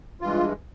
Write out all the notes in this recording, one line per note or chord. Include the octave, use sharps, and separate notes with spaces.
G2 E3 G#3 F4